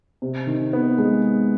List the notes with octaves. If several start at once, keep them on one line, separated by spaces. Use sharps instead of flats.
C3
D#3
B3
G#3